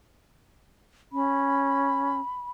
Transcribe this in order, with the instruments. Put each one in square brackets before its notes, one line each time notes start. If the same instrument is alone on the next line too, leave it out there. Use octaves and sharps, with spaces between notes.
[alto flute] C#4 [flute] B5